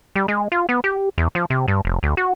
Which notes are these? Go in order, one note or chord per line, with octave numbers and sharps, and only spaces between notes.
G3
G#3
F4
B3
G4
E2
F3
C3
G2
F1
D2
F#4